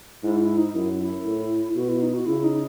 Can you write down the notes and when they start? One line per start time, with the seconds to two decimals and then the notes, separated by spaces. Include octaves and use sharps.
0.23 G#2 E4
0.40 E4
0.57 D#4
0.74 F#2 E4
1.00 E4
1.26 A2
1.75 B2 F#4
1.89 E4
2.01 D#4
2.14 F#4
2.26 C#3 E4
2.44 D#4